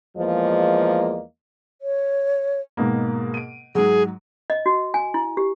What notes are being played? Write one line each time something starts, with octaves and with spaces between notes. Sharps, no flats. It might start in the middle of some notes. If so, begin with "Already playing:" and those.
E2 F3 G#3 A#3 D#5
C#5
G#2 B2 A#3
D7 D#7
G#2 F#3 G#4
D#5
F#4
G#5
E4
G4